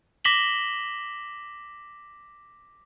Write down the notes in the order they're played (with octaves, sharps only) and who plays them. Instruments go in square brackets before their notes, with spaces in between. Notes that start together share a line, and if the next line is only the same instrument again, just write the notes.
[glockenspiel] D6 A#6 B6 E7 F#7 G7